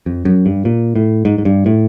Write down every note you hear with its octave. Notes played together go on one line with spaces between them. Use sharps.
F2
F#2
G2
A#2
A2
G#2
G#2
G2
A2